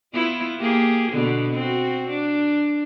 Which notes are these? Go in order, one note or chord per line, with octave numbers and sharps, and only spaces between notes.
B3 E4 F4
A#3 G4 G#4
B2 D3 B3
C4 F#4
D4